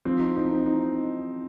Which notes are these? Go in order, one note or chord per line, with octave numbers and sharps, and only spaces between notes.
F3 C4
D#4
D#4
D#4
D#4